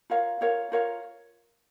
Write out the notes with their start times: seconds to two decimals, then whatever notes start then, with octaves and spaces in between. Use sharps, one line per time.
0.10 F4 A#4 C#5 F5
0.41 F4 A#4 C#5 F5
0.72 F4 A#4 C#5 F5